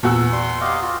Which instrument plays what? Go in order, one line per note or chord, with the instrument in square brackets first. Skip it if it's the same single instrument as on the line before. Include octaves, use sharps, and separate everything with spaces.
[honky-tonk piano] E2 F#4 E6 [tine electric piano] A#2 B3
[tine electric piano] D5 [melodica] C6
[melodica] G4 D#5 F5
F4 F#4